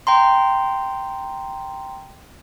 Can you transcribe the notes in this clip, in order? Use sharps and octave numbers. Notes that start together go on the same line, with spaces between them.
G5 A#5 C6